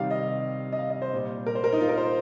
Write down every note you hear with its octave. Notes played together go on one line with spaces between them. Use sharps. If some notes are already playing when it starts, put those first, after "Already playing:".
Already playing: C3 D#3 G3 F5
D#5
D#5
F5
D#5
C5
A#2 G3
A#4
C5
A#4
D#4
F4
A#4
C5